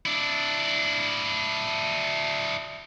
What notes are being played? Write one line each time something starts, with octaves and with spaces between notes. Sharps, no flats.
D4 E4